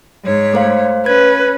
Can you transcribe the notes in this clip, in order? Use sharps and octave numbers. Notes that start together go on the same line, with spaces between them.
G#2 C#5
A3 C5 F5
C#4 B4 G#6